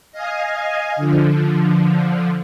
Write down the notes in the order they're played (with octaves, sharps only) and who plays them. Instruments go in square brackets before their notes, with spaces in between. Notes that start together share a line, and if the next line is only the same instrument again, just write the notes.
[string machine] D#5 F5 G#5
D3 F3